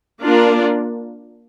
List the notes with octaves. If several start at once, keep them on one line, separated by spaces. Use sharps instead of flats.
A#3 D4 F4 A#4 D5